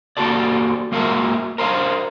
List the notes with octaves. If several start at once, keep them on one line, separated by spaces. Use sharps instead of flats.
A#3 F#4 G4 A4 D5
G#3 A#3 F4 F#4 A#4 E5
A#4 C5 D#5 F5